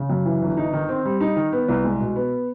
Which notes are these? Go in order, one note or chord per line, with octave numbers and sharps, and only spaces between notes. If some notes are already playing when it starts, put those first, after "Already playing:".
Already playing: C#3
F#2
E3
G1
D#4
D#3
C4
G3
D#4
D#3
B3
C2
G#3
B2
B3